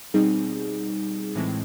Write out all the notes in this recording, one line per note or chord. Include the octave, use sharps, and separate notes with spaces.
B2 G3 C4 D#4 G#4
A2 E3 G#3 C4